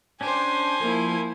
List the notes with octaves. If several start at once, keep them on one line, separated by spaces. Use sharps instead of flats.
C#4 D4 G4 C5 G#5
F3 A#3 E4